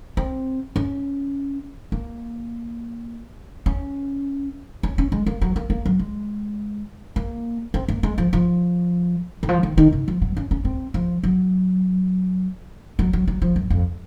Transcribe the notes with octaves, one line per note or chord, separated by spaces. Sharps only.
C4
C#4
A#3
C#4
C#4
C#4
G#3
A#3
F#3
A#3
A#3
F#3
G#3
A#3
C4
A#3
G#3
F3
F3
D#3
F3
D#3
D#3
C#3
F3
F#3
C#4
C#4
C4
F3
F#3
F#3
F#3
F#3
F3
F#2
F2